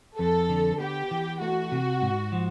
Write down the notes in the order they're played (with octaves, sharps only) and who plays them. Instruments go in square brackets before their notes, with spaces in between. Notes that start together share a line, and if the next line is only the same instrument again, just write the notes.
[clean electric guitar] F2 [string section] A4
[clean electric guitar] D3
[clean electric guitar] B3 [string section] G4
[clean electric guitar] E3
[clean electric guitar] A3 [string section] F#4
[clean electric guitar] C3
G#2
F3